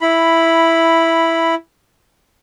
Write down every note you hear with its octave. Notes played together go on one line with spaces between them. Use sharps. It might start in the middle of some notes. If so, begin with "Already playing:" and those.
E4 B5